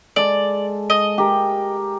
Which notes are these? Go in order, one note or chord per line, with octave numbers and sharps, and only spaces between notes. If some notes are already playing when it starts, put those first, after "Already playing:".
G#3 A4 D5
D#5
G4 A#4